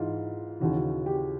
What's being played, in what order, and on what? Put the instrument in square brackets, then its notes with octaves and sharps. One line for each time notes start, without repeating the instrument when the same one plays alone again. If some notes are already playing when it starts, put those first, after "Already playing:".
Already playing: [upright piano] G#2 E3 F4
D#2 C#3 E3 F#4
G4